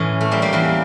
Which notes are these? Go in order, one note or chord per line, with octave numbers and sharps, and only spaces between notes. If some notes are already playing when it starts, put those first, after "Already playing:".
Already playing: A2 E3 C#4
A3
G3 A#3
G3 A#3
E2 E3